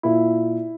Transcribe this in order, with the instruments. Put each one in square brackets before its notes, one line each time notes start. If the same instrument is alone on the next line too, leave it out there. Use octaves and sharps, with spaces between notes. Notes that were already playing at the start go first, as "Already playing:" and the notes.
[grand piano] A#2 E4